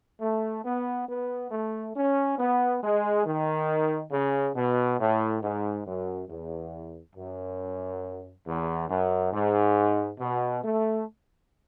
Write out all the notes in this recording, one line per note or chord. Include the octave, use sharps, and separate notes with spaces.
A3
B3
B3
A3
C#4
B3
G#3
D#3
C#3
B2
A2
G#2
F#2
E2
F#2
E2
F#2
G#2
B2
A3